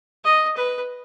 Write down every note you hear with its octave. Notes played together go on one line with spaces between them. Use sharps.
D#5
B4